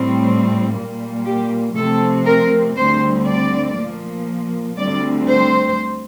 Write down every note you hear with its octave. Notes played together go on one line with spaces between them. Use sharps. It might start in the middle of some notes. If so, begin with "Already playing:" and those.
Already playing: A2 G3 C4
A#2 G3 A#3
G4
C3 F3 A3 C4 A4
A#4
D2 D3 G3 C4 C5
D5
A#2 F3 A#3
D2 D3 G3 C4 D5
C5